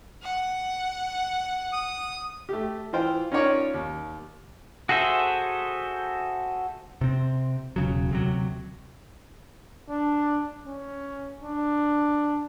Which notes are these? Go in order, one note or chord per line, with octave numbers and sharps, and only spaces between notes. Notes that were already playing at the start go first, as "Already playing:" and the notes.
F#5
D#6
A3 G4
E3 F4 C5 G5
C#4 D#4 F4 A#4 C#5 D5
D#2
F#4 G#4 A4 C5 E5
C3 C4
E1 C#3 F#3
D2 C3 F#3
D4
C#4
D4